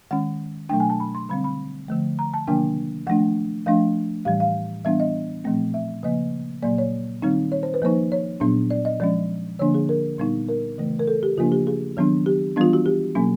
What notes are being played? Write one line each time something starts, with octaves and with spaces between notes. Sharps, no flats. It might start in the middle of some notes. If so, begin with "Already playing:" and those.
D#3 G#3 C#4 F#5
B2 F#3 A3 D4 G5
G#5
A5
B5
C6
D3 G3 C4 B5
B5
D3 F3 A3
A#5
A5
C3 D#3 F#3 A#3 D4 G5
F3 A3 D4 F#5
F3 A3 D4 F5
A2 E3 G3 F5
F5
E3 G3 B3 D4 E5
D#5
A#2 F3 A3 C4
E5
C#3 F3 A#3 D#5
A#2 F#3 A#3 D5
C#5
D#3 G3 C4 D#4
C#5
C5
B4
F3 A#3 D#4 C5
C#5
A#2 F#3 B3 D4
D5
D#5
F3 G#3 C#4 D5
D3 F3 A#3 D4 C#5
G#4
A#4
A#2 G3 B3 D#4
A#4
C#3 E3 A3
A#4
A4
G4
C#3 F3 A#3 D4 F4
G4
G#4
D#3 F#3 B3 D4
G4
E3 G3 B3 D4 F4
F#4
G4
B2 F#3 A#3 C#4